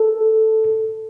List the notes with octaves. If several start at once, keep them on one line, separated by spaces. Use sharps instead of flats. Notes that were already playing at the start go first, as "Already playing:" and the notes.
Already playing: A4